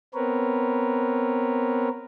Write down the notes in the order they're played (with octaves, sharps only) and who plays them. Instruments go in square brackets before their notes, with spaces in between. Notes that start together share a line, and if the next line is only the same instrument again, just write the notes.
[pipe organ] B3 C4 A#4 B4 C#5